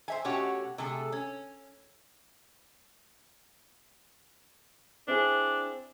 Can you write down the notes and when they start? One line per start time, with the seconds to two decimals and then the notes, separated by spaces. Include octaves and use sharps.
0.08 C5 E5 G#5
0.24 B2 A3 C#4 F#4 G4 C#5
0.78 C3 A3 G#4 A4
1.12 C#4
5.08 C4 D4 E4 G#4